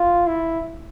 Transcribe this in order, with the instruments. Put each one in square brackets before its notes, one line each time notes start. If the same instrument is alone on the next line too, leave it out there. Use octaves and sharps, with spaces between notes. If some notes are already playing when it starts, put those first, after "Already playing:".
Already playing: [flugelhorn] F4
E4